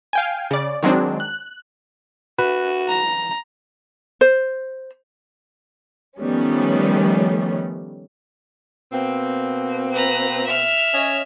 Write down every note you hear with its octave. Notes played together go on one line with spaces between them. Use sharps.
F5 G5 G#5
C#3 D5
D#3 F#3 G#3 C4 D4
F#6
F#4 B4
A#5
C5
D#3 F3 G3 A3 B3 C#4
B2 A#3 C4
B4 A#5
E5 F6
C#4 D#5